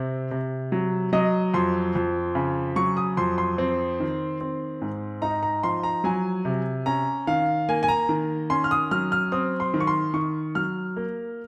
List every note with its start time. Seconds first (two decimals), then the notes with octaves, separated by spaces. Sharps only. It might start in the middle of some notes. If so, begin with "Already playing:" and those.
Already playing: C3 C4
0.31 C3
0.72 F#3
1.13 F#3 D#5
1.54 F2 C6
1.95 F2
2.35 C#3
2.76 F#3 C#6
2.97 D#6
3.17 F2 C6
3.38 C6
3.58 C4
4.00 D#3
4.41 C4
4.82 G#2
5.22 D#4 A#5
5.43 A#5
5.63 F3 C6
5.83 A#5
6.04 F#3 G#5
6.45 C3
6.86 C#4 A#5
7.27 D#3 F5
7.69 A#3 G#5
7.83 G#5
7.88 A#5
8.09 D#3
8.50 C#4 C6
8.64 F6
8.71 D#6
8.91 F#3 F6
9.12 F6
9.32 C4 D#6
9.60 C6
9.74 D#3
9.80 C#6
9.87 C6
10.14 D#3 C#6
10.55 F#3 F6
10.97 A#3